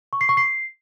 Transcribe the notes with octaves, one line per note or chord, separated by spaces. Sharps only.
C#6
C7
C#6
C7